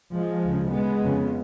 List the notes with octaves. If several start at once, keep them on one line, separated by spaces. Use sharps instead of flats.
F3 G#3
D2 C#3
G#3 B3
F2 C#3